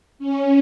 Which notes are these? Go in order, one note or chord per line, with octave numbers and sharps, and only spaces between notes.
C#4